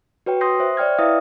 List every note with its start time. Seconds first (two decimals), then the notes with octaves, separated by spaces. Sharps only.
0.26 F#4 B4 C#5 G5
0.41 C6 D#6 G6 A#6 C7
0.60 C5 E5
0.77 C#5 D5 G5 F6 G#6
0.99 E4 B4 E5 F5 D#6